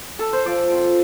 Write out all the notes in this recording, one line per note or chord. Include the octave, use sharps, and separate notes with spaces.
A4
C5
F3 D5
C4 F4